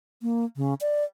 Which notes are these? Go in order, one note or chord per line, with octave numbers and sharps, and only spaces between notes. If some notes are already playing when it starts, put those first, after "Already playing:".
A#3
C#3
D5